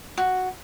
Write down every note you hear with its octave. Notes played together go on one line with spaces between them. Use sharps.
F#4